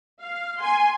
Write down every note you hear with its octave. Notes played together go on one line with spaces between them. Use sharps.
F5
G#5 C6